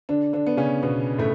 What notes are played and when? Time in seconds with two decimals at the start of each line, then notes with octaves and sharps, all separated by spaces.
0.09 D3 D4
0.33 D3 D4
0.46 B3
0.57 C#3 C#4
0.83 B2 B3
1.19 A2 A3